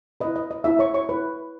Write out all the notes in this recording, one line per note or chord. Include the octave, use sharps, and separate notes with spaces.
E4 B4 D#5
D#5
D#5
E4 E5
C#5 C#6
C#5 C#6
E4 B4